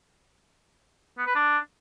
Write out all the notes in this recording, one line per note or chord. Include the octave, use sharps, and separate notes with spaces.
B3
B4
D4